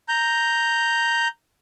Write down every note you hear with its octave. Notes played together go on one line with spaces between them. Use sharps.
A#5 G6